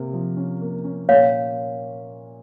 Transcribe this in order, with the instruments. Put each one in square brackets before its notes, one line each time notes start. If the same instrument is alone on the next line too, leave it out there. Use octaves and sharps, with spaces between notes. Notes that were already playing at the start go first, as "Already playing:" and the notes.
Already playing: [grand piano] C3 A#3
F3
C#4
A#3
C#4
[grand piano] A#2 [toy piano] C#5 F5